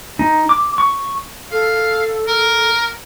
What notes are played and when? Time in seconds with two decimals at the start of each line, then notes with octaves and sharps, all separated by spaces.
0.19 D#4
0.49 D6
0.78 C#6
1.52 A4 F5
2.28 A#4